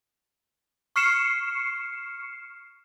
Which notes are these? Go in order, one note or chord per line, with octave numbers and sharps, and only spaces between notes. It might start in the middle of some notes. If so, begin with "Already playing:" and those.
C#6 F6 C7 C#7 E7